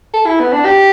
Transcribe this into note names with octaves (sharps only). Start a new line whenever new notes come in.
A4
E4
B3
D4
G4